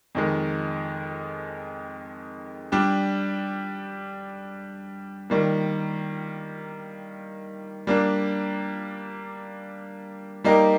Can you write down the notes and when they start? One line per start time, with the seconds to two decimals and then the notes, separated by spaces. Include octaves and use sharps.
0.15 F2 D#3 G#3
2.72 G3 D4 G4
5.30 D#3 G3 A#3
7.87 G3 A#3 D4
10.44 G3 A#3 D#4 G4 A#4